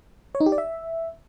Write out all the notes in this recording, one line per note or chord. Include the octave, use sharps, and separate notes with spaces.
C#5
D#4
G4
D5
E5